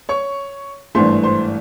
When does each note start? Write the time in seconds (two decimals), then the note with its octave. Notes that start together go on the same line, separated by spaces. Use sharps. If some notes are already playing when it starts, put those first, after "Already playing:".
0.09 C#5 C#6
0.95 G#1 G2 E3 A3 C5 C6
1.23 C5 C6